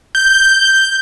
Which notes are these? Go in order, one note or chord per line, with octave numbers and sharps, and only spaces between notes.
G6